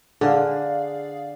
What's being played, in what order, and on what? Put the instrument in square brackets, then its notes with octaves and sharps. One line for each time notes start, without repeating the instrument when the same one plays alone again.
[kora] D3 [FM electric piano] G#4 D5 F5